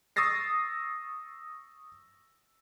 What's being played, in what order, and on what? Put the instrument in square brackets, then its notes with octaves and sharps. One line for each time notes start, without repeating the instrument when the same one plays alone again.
[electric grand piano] C#6 D#6 E6 A6 A#6 C7